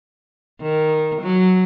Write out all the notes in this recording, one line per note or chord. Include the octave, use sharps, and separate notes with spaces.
D#3
F#3